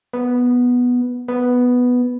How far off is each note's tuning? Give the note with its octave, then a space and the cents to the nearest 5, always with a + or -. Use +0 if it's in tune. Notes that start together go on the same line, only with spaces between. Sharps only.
B3 -5
B3 +0